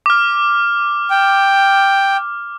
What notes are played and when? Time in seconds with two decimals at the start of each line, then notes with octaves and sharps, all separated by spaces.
0.06 D6 F6
1.10 G5